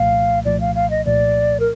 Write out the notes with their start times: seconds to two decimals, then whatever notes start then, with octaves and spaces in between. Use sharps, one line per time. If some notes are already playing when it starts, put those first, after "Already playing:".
Already playing: C2 A#2 F3 A3 F5
0.45 C2 A#2 F3 A3 D5
0.61 F5
0.75 F5
0.90 D#5
1.05 C2 A#2 F3 A3 D5
1.60 A#4